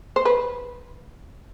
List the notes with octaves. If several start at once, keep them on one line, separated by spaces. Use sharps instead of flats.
C5
B4